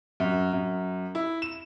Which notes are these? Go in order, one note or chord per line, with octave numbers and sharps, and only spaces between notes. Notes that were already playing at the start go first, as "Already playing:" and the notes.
F#2
F#2
E4
E7